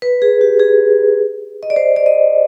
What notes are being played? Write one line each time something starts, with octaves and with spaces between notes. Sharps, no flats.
B4
G#4
G4
G#4
D#5
D5
C5
D5
D#5